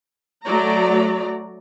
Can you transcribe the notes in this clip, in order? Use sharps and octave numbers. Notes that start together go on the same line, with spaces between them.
F#3 A3 D5 A#5